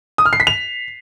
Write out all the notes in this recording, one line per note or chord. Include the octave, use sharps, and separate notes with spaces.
D#6
F6
C7
B6
F7